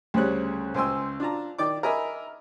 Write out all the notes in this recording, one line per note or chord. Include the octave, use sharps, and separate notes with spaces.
D2 C#3 G3 C5 C#5 F#6
C#2 C5 G5 G#5 C6 E6
D4 F4 A5 A#5
D#3 D5 G5 D6
A#4 D#5 E5 G#5 B5